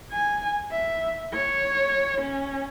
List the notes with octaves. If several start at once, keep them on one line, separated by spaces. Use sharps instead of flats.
G#5
E5
C#5
C#4